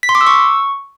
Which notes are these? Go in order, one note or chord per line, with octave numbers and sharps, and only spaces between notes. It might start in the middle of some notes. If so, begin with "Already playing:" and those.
B6
C6
D6
E6
C#6